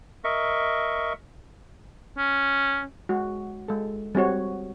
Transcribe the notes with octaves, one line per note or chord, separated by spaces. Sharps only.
A#4 D#5 E5 C#6
C#4
G#3 F#4
G#3 A4
G3 C4 F#4 C#5